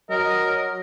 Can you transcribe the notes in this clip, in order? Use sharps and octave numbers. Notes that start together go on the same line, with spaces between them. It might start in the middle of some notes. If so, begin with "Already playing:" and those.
F#3 A#4 D#5